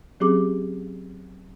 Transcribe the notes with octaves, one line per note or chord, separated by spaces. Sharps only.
F#3 C4 C#4 G4 G#4 D6